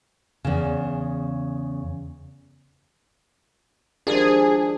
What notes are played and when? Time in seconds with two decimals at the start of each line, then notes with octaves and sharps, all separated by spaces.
0.44 E2 C#3
4.07 D#3 F3 G#3 D4 F4 G4 G#4 A#4